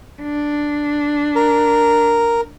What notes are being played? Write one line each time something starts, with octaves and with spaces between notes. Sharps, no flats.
D4
A#4